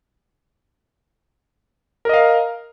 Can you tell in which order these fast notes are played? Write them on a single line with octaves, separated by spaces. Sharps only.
A#4 D#5 F5